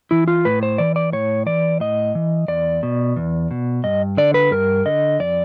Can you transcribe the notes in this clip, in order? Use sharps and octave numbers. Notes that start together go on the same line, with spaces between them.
E3 E4
F4
A2 B4
C5
E3 D5
D5
A2 C#5
E3 D5
A2 D#5
E3
E2 D5
B2
E2
B2
G2 D#5
D3 D5
B4
G2 A#4
D3 D#5
F2 D5